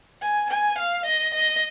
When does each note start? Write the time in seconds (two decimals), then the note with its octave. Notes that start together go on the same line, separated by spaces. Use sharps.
0.22 G#5
0.51 G#5
0.79 F5
1.06 D#5
1.35 D#5